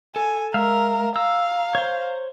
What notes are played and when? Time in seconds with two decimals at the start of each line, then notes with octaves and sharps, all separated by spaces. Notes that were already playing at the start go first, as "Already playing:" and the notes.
0.16 A4 G#5
0.54 G#3 A#4 E5 F5
1.16 F5 A#5 E6
1.75 C5 C#5